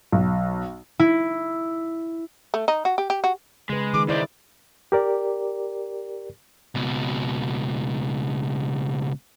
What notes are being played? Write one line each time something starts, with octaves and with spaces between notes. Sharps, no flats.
B1
E4
A3
D#4
F#4
G4
G4
F#4
C#3 G#3 B4
D#3 G#4 D6
G#2 E4 C5 D5 D#5
G4 A#4 D5
C#2 B2